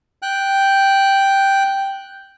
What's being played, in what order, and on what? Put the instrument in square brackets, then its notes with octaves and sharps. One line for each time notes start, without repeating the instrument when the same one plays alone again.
[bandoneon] G5 F#6